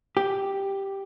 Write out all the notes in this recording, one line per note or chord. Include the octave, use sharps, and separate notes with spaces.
G4